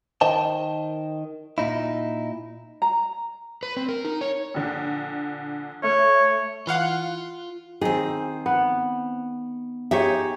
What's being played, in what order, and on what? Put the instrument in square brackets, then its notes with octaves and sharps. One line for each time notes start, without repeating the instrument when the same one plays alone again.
[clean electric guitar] D#3 C5 D#5 G5 A5
A#2 D#4 E4
[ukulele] A#5
[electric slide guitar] B4
C4
A#4
D#4
C#5
[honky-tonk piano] A#1 D3
[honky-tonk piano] A3 [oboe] C#5
[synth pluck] E3 F5 F#5 [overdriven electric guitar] F4
[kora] D#3 [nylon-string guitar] C4 G#4
[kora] B3
[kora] D#4 G#4 C#5 [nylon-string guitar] G4 E5